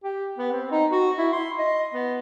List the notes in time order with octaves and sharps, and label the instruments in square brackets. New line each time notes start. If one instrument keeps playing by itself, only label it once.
[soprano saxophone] G4
B3
C4
D#4
F#4
E4
C6
D#5
B3